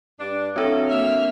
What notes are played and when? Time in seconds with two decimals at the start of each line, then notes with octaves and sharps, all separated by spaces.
0.19 G2 D4
0.56 F#3 C4 D4 E4 A4
0.89 A#3 E5 F6